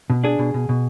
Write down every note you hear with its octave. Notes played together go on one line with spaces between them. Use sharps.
B2
D4 G#4
B2
B2
B2